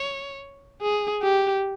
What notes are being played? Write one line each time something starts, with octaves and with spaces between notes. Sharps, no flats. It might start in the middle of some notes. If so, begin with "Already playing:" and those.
Already playing: C#5
G#4
G4